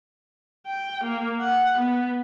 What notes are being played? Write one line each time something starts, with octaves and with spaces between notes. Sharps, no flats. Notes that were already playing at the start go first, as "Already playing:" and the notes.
G5
A#3
F#5
B3